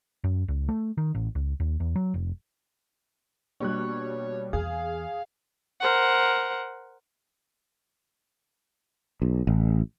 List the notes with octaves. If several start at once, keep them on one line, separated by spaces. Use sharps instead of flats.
F#2
C#2
A3
D#3
A1
C#2
D#2
E2
F#3
F1
B2 G3 A#3 D4 C#5 F#6
E2 G#4 F5 F6
A#4 C5 F#5
B1
A1